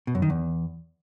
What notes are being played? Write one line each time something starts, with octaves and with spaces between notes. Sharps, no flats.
B2
F#2
D#3
E2